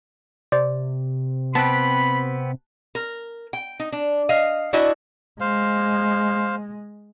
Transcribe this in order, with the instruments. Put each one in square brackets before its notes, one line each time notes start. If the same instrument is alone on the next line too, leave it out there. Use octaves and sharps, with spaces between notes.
[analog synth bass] C3 [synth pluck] C5 D5
[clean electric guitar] B3 C4 G4 [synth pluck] A5 F#6 [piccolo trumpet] B5
[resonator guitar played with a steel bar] A#4
G5
D#4
D4
D#5 F5
D4 E4 F#4 D5 D#5
[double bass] G#3 [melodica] C5 F5